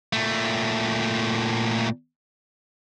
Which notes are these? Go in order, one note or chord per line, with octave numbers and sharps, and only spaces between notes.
A#2 A3